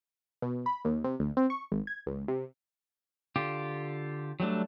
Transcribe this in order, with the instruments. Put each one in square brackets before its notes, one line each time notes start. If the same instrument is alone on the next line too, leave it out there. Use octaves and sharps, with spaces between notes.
[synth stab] B2
B5
D#2
C3
D2
C4
C#6
G#1
G#6
C#2
C3
[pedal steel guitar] D3 F4 G4
F#3 G3 A3 D4